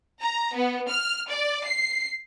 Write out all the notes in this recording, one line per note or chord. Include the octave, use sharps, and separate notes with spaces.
A#5
B3
F6
D5
C7